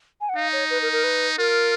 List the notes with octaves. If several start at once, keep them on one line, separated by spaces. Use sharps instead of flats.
G#5
F#5
D#4 F5
C#5
B4
A#4
A#4
B4
F4 A#4